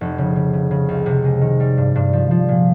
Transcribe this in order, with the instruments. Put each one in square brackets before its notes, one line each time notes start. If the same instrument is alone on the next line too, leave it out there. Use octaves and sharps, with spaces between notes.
[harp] F1
C#3
C#3
C#3
C#3
C#2
C3
G#3
D#3
G3
G2
G2
F3
F3
A#2